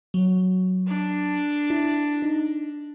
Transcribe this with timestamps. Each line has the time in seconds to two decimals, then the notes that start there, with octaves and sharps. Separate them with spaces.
0.14 F#3
0.87 D4
1.70 E4
2.22 D#4